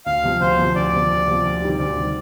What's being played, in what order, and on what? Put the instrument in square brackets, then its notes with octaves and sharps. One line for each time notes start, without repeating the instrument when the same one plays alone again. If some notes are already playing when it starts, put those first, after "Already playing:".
[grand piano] D2 [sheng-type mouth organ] F5
[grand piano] C3 F3
[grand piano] D2 [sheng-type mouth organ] C5
[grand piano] C3 F3
[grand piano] D2 [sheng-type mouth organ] D5
[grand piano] C3 F3
D2
C3 F3
D2
C3 D#3 G3
[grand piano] D2 [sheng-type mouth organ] D5
[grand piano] C3 D#3 G3